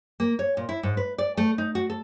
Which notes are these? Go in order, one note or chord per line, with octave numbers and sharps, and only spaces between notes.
A#3
C#5
A#2
E4
G#2
B4
D5
A3
D#4
F#4
A4